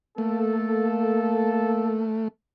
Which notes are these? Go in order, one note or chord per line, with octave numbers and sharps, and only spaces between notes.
A3 A#3 A4